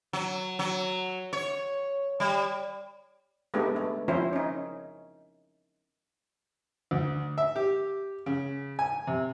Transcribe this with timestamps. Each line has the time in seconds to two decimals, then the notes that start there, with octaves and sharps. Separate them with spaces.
0.13 F#3
0.59 F#3
1.33 C#5
2.20 G3
3.54 G#3 A3 B3 D4 D#4 G4
3.76 A3
4.08 F3 C4 C#4 E4 C5
4.33 C#4 D#4
6.91 D2
7.38 E5
7.56 G4
8.26 C#3
8.79 G#5
9.07 C3